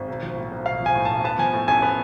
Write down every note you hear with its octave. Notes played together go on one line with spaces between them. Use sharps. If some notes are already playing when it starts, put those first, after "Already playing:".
Already playing: G#1
B1
F3
A2
B1
B1 F5
F3
G#5
A2
B1 A5
B3 A5
F3 G#5
A2
A1 G#5
B3